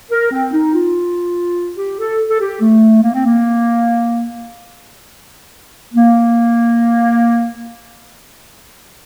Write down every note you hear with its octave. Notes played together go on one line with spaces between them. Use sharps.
A#4
C4
D#4
F4
G4
A4
A4
G4
A3
A#3
C4
A#3
A#3